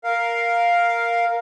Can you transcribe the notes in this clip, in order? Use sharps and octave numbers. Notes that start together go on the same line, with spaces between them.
A#4 F5